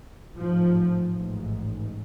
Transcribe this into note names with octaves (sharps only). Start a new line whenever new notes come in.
A1 G#2 F3
A1 G#2